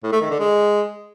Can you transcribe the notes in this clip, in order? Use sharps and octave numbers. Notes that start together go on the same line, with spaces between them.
A2
A3
D#3
D3
G#3